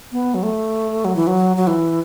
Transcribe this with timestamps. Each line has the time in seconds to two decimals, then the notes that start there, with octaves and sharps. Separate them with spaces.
0.12 B3
0.34 F#3
0.43 A3
1.05 F#3
1.16 E3
1.27 F#3
1.57 F#3
1.67 E3